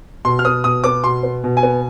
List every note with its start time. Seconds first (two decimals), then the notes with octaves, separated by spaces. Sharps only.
0.25 B2 C6
0.39 F6
0.45 B3 D#6
0.64 B2 D#6
0.84 B3 D6
1.03 B2 C6
1.23 B3
1.44 B2
1.57 G#5
1.63 B3